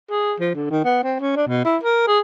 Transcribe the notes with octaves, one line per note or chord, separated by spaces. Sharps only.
G#4
F3
D3
D#3
B3
C4
C#4
D4
B2
E4
A#4
G#4